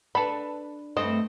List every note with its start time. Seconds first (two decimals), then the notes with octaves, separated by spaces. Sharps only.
0.15 D4 A4 B4 B5
0.97 G2 A3 C4 D#5